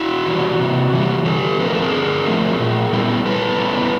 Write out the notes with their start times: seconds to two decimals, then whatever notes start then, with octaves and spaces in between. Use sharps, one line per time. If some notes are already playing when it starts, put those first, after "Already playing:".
Already playing: E4 F#4
0.26 E3 G3
0.60 C3
0.93 E3 G3
1.25 D3 G4 A4
1.60 F3 A3 C4 B4
1.67 A#4
1.75 A4
1.82 G#4 A#4
1.92 D3
2.25 F3 A3 C4
2.59 A#2
2.93 G3 B3 E4
3.25 A#2 A4 B4
3.59 G3 B3 E4